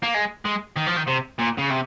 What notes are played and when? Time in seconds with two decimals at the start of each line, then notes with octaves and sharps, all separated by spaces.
0.03 A#3
0.14 G#3
0.45 G#3
0.77 D#3
0.87 F3
0.97 D#3
1.08 C3
1.39 A#2
1.58 C#3
1.71 C3